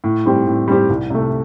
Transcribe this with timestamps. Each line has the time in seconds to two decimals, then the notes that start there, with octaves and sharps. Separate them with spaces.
0.04 A2
0.26 G3 C4 G4
0.47 A2
0.68 G3 C4 G4
0.90 C2
1.10 C3 A3